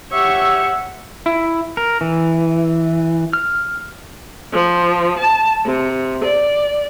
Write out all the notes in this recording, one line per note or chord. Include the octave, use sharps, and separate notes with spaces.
G4 C#5 E5 F#5 C#6 E6
E4
A#4
E3
F6
F3
A5
C3
D5